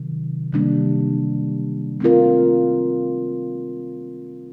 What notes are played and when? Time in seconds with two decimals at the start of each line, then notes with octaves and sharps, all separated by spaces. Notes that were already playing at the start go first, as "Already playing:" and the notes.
Already playing: C3 D#3 F#3
0.52 C3 D#3 G3 A#3 D4
2.00 A3 C4 F4 A#4